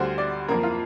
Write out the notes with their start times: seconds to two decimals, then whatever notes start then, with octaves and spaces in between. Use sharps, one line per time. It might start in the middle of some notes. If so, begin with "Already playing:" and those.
Already playing: D2 D3 G3 C5
0.18 D5
0.48 F2 F3 A#3 A#4
0.63 F4